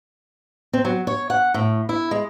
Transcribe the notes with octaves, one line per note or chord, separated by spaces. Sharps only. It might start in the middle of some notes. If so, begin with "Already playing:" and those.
C4
F#3
C#5
F#5
A2
E4
G#3